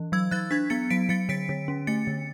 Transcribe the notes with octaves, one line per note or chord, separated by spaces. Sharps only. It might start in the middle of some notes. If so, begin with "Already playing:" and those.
Already playing: E3
F#3 E6 G#6
F#3 F#6 A6
D4 G#6 B6
B3 A6 C#7
F#3 B6 D7
F#3 A6 C#7
D3 B6 D7
D3
C#4
A3 A6 C#7
D3